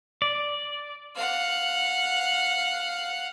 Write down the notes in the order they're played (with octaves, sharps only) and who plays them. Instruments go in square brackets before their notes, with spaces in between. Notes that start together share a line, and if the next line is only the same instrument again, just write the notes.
[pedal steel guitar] D5
[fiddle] F5 F#5